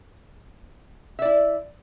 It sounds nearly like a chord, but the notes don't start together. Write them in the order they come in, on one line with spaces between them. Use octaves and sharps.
E5 D5 E4